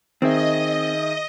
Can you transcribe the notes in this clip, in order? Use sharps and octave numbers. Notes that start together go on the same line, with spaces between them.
D#3 C4 G#4 D#5 E5